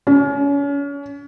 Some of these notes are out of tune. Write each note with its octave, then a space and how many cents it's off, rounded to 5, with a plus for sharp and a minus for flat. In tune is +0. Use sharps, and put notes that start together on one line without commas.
C#4 +35